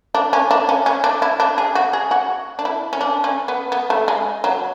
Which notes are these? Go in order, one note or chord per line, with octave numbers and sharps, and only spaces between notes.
D4
C#4
D4
C#4
C#4
D4
E4
D4
G#4
F#4
G#4
F#4
D4
E4
C#4
D4
C#4
B3
B3
A3
G#3
F#3